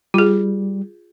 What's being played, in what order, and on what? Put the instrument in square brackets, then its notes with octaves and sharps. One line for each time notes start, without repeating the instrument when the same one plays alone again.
[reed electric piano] G3 [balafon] F4 G#4